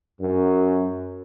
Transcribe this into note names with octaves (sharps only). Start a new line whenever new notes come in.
F#2